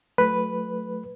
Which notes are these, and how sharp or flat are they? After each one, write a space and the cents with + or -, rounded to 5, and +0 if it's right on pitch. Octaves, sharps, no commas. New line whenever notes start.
F#3 -25 A3 +0 B4 +0